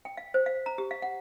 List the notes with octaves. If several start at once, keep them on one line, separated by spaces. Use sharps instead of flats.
G5
F5
C5
F5
A#5
G4
F5
F#5